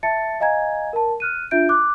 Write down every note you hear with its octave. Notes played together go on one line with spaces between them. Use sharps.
E5 A5 A6 C#7
D#5 F5 G#5 A#5 G#6
A#4 A5
F6 F#6 D#7
D4 F4 E5 G6 D7
D6 F#6